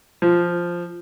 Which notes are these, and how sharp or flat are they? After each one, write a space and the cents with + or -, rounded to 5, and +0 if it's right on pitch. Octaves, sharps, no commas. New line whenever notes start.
F3 -5